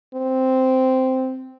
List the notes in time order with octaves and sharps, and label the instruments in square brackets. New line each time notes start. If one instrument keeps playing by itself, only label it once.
[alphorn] C4